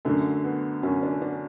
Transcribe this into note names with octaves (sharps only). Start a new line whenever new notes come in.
F#2 D3 F#3 A3
B3
F#2 D3 F#3 C#4
D4
D4